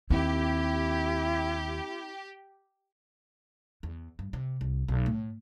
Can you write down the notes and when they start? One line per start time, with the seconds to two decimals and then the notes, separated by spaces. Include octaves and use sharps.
0.10 D#2 C4 E4 G4
3.83 E2
4.19 G2
4.33 C3
4.61 C2
4.88 B1
5.06 A2